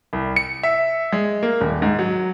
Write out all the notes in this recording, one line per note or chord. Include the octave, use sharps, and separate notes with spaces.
C2
C#7
E5
G#3
A#3
D#1
G#2
F#3